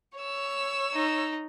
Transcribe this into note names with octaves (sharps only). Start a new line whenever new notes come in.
C#5 E6
D#4